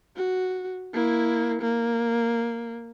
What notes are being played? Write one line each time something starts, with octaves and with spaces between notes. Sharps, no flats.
F#4
A#3 E4
A#3